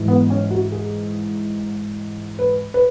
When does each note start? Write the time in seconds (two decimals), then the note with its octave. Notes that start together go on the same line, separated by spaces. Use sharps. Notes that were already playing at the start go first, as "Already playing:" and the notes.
Already playing: G#2 E3
0.08 B3
0.30 C#4
0.51 F#4
0.72 G#4
2.39 B4
2.74 B4